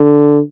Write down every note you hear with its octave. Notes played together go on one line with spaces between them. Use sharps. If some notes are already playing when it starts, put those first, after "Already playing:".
Already playing: D3